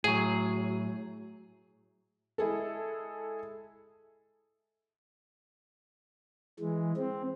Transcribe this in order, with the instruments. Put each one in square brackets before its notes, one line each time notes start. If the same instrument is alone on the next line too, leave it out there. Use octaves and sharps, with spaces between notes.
[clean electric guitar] A2 F#3 [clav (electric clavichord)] G#4
[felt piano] G#3 E4 G#4 A4
[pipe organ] E3 G#3
C4